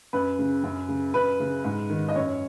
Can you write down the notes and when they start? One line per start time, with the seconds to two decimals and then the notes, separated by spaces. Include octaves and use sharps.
0.13 F#2 B4
0.39 C#3
0.63 F#2
0.89 C#3
1.14 F#2 B4
1.40 C#3
1.64 G#2
1.90 D#3
2.09 D#5
2.16 F#2 C#5